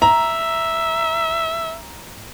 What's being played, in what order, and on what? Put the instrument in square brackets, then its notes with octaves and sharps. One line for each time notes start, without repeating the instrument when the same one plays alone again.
[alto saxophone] E5 [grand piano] A#5